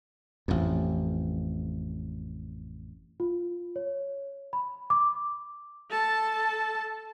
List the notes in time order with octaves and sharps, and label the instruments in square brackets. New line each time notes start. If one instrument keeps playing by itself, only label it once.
[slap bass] A1 F2
[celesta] F4
C#5
B5
D6
[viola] A4 A5